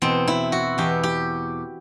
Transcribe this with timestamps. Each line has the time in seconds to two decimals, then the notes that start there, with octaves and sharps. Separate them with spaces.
0.02 E2 B2 C4
0.28 E4
0.52 F#4
0.78 E2 B2 G4
1.04 G4